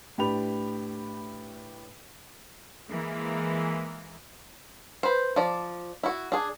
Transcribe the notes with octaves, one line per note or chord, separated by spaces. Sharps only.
A2 D4 G4 B4 B5 F7
E3 G#3 A#3
B4 C5
F3 D5
E4 F#4
D4 G#4